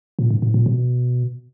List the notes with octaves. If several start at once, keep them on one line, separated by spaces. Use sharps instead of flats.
A#2
G#2
A2
A#2
B2